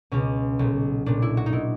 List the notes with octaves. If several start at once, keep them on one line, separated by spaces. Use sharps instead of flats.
C#2 B2 C#4
B1 A#2
B1 A#2 D4
E4
F#4
D#4
A#2 E4